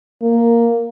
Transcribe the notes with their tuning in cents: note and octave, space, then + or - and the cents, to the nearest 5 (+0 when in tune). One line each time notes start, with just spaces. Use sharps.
A#3 +0